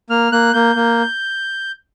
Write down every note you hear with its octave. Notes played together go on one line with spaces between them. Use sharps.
A#3 F6
A#3 F#6
A#3 G6
A#3